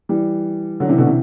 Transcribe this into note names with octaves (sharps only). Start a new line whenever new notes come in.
E3 G3
D3 F#3
C3 E3
B2 D3
C3 E3